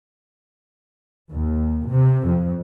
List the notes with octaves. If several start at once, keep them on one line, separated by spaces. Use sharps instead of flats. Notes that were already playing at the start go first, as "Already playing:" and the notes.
D#2
C3
F2